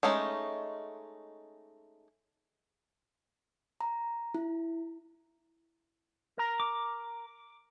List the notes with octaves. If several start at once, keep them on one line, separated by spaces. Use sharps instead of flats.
G#3 A3 C#4 D#4
A#5
E4
A#4 A#5
D6